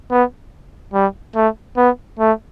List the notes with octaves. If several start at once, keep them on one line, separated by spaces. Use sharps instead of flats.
B3
G3
A3
B3
A3